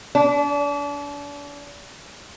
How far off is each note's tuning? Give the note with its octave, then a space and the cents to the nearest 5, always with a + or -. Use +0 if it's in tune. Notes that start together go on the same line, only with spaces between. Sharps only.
D4 -35